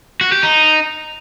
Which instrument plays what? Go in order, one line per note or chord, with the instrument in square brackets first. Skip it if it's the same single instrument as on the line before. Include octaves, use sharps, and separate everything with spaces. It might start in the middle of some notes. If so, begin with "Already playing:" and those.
[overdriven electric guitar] F#4
G4
D#4